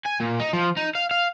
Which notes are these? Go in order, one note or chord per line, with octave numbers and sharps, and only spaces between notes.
G#5
A#2
D#4
F3
D#4
F5
F5